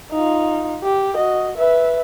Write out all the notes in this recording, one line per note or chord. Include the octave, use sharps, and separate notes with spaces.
D#4 F4
G4
F#4 D#5
B4 E5